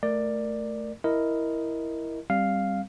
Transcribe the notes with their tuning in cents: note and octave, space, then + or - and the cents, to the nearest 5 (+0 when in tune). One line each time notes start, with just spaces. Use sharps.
A3 +0 A#4 +0 D5 +10
E4 +0 A#4 +0 D#5 +0
G3 +0 C4 +15 F5 +0